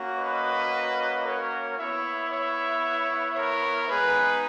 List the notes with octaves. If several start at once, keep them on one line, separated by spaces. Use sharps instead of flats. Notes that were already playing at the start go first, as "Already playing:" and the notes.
Already playing: A#3 C#4 F#4
B4 D#5
A#4 C#5
B3 E4 C#5 E5
C#5 E5
A#4 C#5
G#3 B3 D#4 G#4 B4